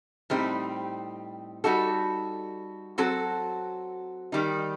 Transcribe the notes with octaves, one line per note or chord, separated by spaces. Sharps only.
A2 G3 C4 D#4
G3 D#4 F#4 A4
F#3 C4 F#4 A4
D#3 G3 D#4